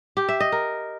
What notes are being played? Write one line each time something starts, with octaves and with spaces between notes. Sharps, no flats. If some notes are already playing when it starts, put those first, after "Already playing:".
G4
E5
D#5
A#4